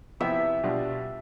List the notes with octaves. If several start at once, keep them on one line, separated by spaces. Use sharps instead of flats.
C3 F3 B3 E4 G4 E5
B2 G3 D4 F4